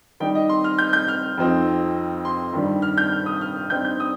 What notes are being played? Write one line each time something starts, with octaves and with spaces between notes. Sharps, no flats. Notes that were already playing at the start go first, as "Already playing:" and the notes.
D#3 G3 D#4 G5
D#5
C6
F6
G6
G6
F6
F2 F3 C4 D#4
C6
G2 D#3 G3
F6
G6
F6
D#6
F6
G2 G3 C4 D#4 G6
G6
D#6